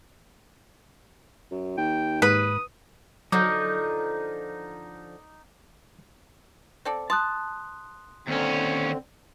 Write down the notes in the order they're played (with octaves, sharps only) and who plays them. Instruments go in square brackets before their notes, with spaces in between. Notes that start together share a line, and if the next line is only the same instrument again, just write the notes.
[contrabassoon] F#2
[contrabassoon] D#2 [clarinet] G5
[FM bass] G#2 [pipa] B4 [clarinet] D#6
[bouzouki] D3 F3 [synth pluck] F#3 [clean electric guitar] D#4 [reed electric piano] D6 G6
[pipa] C4 A4 D5
[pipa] A5 [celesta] C6 D#6 F#6
[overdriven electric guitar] D#2 C#4 [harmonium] D3 C4